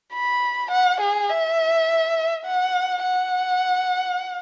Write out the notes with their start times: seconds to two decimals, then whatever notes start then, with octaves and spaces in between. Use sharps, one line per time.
0.14 B5
0.71 F#5
1.01 G#4
1.30 E5
2.46 F#5
3.03 F#5